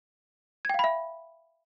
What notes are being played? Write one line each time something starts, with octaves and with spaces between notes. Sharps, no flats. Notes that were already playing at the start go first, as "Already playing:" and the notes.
E5 F5 G5 B5 G#6